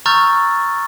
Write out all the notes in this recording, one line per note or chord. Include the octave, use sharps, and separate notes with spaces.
A#5 C#6 E6 F6 G6 A6